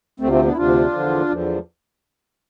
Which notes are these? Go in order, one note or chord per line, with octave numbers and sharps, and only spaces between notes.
D2 C3 F3 A3 C4
A3 C4
B3 D4
E4
D2 C3 F3 D4 F4
E2 D3 F3
E2 D3 F3